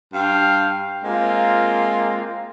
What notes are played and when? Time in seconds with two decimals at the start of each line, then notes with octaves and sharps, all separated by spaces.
0.14 G2 F5 G5
1.04 G#3 A#3 C4 F4